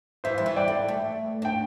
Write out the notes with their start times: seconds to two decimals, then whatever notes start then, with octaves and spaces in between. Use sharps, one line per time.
0.24 E3 C5 E5
0.38 G3
0.46 E3
0.56 D5 G5
0.68 A3
0.88 A3
1.42 D4 G5